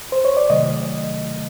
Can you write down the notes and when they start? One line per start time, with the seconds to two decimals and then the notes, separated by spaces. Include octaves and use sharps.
0.12 C5
0.25 C#5
0.37 D5
0.50 C3 D#3 F#3 A3 D#5